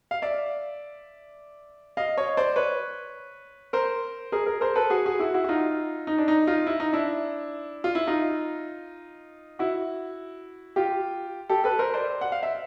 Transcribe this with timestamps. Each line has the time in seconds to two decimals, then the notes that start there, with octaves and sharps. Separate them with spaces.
0.11 F5
0.22 D5 E5
1.97 D#5 F5
2.18 C#5 D#5
2.37 C5 D5
2.56 B4 C#5
3.73 A#4 C5
4.32 G#4 A#4
4.46 G#4 A#4
4.61 A#4 C5
4.76 A4 B4
4.90 F#4 G#4
5.06 F#4 G#4
5.19 E4 F#4
5.34 E4 F#4
5.44 F#4
5.49 D#4 F4
6.07 D#4
6.18 D4
6.28 D#4
6.47 D#4 F4
6.67 E4
6.80 D#4
6.93 D4 E4
7.84 F4
7.95 E4
8.07 D#4 F4
9.59 E4 F#4
10.76 F4 G4
11.49 G4 A4
11.64 A4 B4
11.79 A#4 C5
11.94 C5 D5
12.21 F#5
12.32 F5
12.43 E5